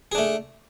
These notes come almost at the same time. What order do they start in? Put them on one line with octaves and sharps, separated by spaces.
G#4 D4 A3